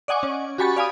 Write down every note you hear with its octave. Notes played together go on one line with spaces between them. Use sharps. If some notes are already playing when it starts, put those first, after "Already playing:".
D5 D#5 F#5 G#5 C#6 D6
C#4
F#4 G4 G#5 B5 C#6 A6
D5 F5 G#5 B5 D#6